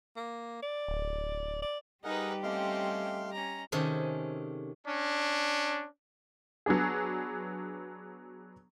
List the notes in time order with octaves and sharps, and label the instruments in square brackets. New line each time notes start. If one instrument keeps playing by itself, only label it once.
[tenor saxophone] A#3
D5
[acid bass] D1
[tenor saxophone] D5
[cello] G3 G4 [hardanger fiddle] D#4 B4 [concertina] G#4 A#4 F#5
[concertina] A3 F5 C6 [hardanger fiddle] C4 C#4 [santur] D#5 F#5 D6
[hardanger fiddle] C#4 A#5
[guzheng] C3 D#3 C#4 G#4 A4
[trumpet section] C#4 D4
[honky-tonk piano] F#3 B3 D4 G#4